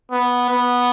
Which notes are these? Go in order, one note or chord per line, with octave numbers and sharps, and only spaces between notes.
B3
B3